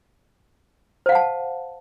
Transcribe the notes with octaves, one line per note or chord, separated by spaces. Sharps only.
C5 F5 F#5 A5